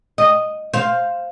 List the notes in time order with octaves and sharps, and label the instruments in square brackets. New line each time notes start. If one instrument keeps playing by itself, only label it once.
[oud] D#5
C5 F5